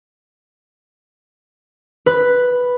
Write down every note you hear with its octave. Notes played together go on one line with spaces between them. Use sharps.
B4